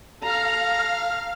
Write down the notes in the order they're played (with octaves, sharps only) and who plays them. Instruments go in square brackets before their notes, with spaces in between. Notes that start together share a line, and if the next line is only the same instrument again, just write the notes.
[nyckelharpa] A4 A#5 [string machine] F5 F6